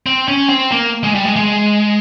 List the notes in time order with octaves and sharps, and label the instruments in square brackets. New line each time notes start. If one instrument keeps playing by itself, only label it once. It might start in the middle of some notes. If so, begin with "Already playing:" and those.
[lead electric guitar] C4
C#4
C4
A#3
G#3
G3
G#3
G#3